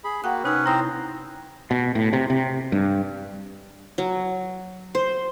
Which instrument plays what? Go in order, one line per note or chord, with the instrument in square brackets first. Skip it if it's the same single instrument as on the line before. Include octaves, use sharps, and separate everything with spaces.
[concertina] G#4 B5
[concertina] A#3 F#4 [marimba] F#5 G5 F#6
[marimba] C3 D#4 E6 [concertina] C#4 B4
[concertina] C4 C5 A#5 [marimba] E4 D#6
[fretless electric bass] B2
A2
C3
C3
G2
[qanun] F#3
C5